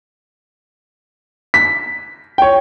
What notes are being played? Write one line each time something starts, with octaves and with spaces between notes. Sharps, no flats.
B6
C#5 G5